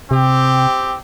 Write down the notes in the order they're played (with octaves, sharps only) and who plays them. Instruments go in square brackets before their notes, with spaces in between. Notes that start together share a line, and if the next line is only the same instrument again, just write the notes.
[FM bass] C3 [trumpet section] C4 G4